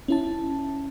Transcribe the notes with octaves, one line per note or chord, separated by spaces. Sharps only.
C#4 E4 A5